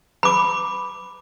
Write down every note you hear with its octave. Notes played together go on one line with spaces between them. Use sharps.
B5 D6